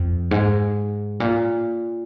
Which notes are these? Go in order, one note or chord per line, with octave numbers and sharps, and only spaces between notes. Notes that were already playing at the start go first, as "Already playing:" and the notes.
Already playing: F2
G#2
A#2